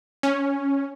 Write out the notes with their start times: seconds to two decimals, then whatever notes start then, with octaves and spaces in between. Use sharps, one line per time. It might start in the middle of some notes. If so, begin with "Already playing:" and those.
0.23 C#4